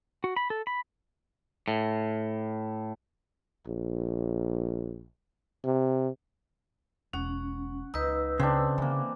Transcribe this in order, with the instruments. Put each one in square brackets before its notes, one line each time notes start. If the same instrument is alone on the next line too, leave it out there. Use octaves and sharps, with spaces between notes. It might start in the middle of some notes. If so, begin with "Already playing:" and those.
[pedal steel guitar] F#4
B5
A4
B5
[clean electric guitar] A2
[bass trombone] A#1
C3
[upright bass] E1 [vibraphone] C#4 [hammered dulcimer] F#5
[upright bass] C#2 [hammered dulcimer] D#4 [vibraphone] B4 E6
[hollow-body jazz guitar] C#3 [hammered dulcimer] C4 D4
[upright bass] D3 [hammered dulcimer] E3 A#3